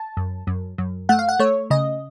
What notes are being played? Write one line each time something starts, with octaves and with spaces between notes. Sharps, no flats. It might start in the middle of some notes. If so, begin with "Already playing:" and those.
Already playing: A5
F#2
F#2
F#2
A3 F#5
F5
F#5
A3 C#5
C#3 D#5